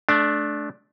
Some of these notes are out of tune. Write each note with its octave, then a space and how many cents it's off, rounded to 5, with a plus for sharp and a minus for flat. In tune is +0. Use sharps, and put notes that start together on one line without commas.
A3 -25 D4 +0